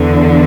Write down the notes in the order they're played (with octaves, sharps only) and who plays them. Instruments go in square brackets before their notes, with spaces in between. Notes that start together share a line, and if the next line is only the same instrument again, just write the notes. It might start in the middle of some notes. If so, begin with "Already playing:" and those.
Already playing: [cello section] E2 D3